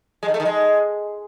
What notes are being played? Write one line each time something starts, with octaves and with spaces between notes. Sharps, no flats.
G#3
D#3
A3
D#3
G#3